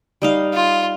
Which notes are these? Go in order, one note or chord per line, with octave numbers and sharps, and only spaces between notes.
G3 D#4 F5
F4